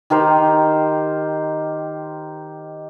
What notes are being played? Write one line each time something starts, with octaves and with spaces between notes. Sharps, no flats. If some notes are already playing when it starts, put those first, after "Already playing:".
D#3 G4 A#4 C5